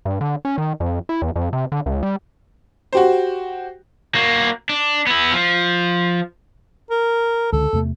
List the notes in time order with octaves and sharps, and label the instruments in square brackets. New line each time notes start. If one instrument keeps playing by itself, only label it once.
[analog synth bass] G2
D3
C#4
D#3
F2
E4
E2
F2
C3
D3
C#2
G3
[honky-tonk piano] F#4 G4 C5
[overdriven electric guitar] A#3 F#4
D4
B3 E4
F3
[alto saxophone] A#4
[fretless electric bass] C#2 D3 [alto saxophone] A4
[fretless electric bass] E2 C3 A3